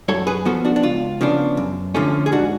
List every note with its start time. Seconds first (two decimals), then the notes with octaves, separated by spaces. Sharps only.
0.08 F#2 A4 C#5
0.27 G#4 B4
0.45 F3 B3 F#4 A4
0.65 D4 F#4
0.76 D4
0.83 C#2 F4
1.21 C#3 F3 B3 D4
1.57 F#2
1.95 D3 F3 A3 C#4
2.26 G#4
2.32 G#2 D4 F#4